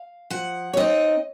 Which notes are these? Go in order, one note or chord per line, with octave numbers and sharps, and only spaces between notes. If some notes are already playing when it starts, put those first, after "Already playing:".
Already playing: F5
F3 F#5
C#5
C4 D#4 D#5